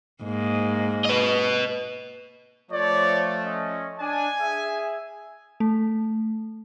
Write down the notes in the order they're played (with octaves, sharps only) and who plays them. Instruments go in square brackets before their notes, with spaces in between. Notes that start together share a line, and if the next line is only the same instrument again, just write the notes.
[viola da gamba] G#2 A#3
[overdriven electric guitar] B4 D#5
[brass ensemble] F3 A3 [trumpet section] C#5 D5
[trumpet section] C#4 D#5
[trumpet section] D4 [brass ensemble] G#5
[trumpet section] G#4 E5
[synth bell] A3